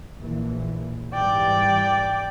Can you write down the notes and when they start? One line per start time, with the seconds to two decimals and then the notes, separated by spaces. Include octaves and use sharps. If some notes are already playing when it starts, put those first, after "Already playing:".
0.19 A#1 E3
1.14 G#2 E3 G3 D5 G5